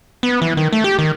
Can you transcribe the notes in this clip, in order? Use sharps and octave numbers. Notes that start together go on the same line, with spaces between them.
B3
E3
D#3
A3
G4
D#3